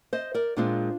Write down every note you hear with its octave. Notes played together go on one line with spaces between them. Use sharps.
C5 D#5
A#4 D5
A#2 G#3 C4 D4 F4